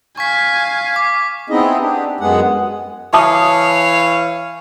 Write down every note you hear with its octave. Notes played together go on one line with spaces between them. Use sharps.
F5 G#5 C#6 B6
D6
B3 C4 D#4 E4 G#4 D#5
D4 G4
F#2 G#3 B3 G#4 F#5
E3 C#5 E5 F5 A5 D#6